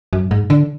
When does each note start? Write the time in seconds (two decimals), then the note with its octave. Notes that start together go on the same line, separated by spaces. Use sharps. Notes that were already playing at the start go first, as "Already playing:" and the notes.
0.13 F#2
0.31 G#2
0.50 D3